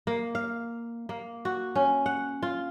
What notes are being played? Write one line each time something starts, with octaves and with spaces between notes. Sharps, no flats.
A#3
F5
A#3
F#4
C#4
F#5
F4